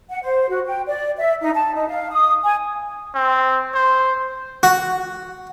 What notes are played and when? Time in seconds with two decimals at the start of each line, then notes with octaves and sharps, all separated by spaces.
0.09 F#5
0.22 C5
0.49 F#4
0.66 G5
0.87 D5
1.18 E5
1.41 D#4
1.55 A5
1.74 D#4
1.88 F5
2.11 D#6
2.44 G#5
3.15 C4
3.74 C5
4.63 F#4